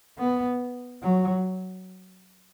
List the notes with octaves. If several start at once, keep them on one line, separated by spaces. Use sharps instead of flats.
B3
F#3